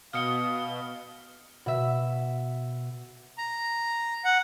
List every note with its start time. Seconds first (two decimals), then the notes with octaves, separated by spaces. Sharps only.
0.13 B2 F5 D#6 F6 C#7 G7
1.66 B2 E5
3.38 A#5
4.25 F#5